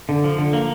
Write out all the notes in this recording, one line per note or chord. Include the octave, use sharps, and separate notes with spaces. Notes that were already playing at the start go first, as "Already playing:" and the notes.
D3
F3
D3
A#3